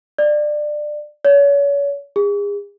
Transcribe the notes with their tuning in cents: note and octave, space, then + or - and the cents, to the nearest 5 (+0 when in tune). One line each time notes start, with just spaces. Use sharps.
D5 +20
C#5 +35
G#4 -35